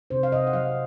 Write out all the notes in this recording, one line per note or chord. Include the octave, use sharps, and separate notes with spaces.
C3 C5
F5
C3 D#5
F#5
F#3 F5